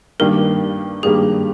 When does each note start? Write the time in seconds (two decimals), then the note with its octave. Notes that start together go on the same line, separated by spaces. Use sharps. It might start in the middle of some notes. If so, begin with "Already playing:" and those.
0.20 G2 D#3 G3 A#3 D4 A#4
1.03 G2 D#3 G3 A#3 D4 G#4